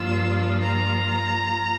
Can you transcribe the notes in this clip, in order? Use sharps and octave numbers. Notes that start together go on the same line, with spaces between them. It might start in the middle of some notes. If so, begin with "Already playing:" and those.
Already playing: G2 F3 A#3 F4 E6
A#5